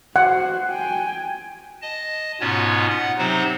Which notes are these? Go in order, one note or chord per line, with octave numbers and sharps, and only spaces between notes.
F#4 C5 F#5
G5 G#5
D#5 A5
G#2 B2 B3 C#4 F4 C#5
F#5
C3 F#3 C4 D#4 C5